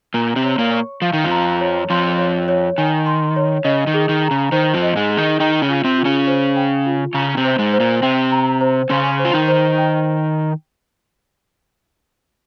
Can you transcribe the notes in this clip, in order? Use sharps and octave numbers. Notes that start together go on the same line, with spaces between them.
A#2 A#3 A#5
C3 C4
C#5
A#2 A#3
C#6
F3 F5
D#3
F2 F3
A#5
C#5
F2 F3 C6
C#5
C#5
D#3 G#5
C6
C#5
C#3 D#5
D#3
G#4
D#3
A#5
C#3
D#3 C5
F2 F3
D#5
G#2 G#3
G#4
D#3 D#4
D#3 D#4 G5
C#3 C#4
F4
C3 C4
F4
C#3 C#4
C5
G5
F4
C#3 C#4 A#5
C3 C4
C5
G#2 G#3
C5
A#2 A#3
C3 C4 G5
A#5
C5
C#3 C#4 C6
C5
F4
D#3 D#4
C5
G5